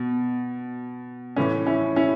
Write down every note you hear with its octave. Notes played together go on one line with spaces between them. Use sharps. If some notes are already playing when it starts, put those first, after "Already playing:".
Already playing: B2
A2 E3 C#4
C#4 E4
C#4 E4